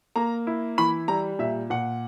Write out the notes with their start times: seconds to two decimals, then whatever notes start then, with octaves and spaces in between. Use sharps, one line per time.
0.16 A#3 A#5
0.47 E4
0.78 E3 B5
1.08 G3 A#5
1.39 A#2 E5
1.70 A#2 F#5